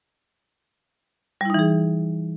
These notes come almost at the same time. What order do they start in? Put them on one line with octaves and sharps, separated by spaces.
G3 E4 D#4 E3 G#4